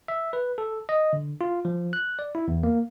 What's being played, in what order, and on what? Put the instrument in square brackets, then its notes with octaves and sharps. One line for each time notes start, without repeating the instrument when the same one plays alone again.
[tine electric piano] E5
B4
A4
D#5
D3
F4
F3
F#6
D5
E4
E2
A#3